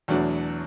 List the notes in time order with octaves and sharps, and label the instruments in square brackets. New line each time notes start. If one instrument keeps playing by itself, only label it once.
[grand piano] E2 B2 F#3 A3 D4